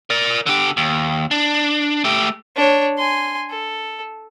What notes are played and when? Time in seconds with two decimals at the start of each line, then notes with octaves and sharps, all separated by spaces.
0.10 A#4 D5
0.46 D3 G4
0.77 D#2
1.31 D4
2.04 A3 G4
2.56 D4 C#5
2.98 G#5 C6
3.50 A4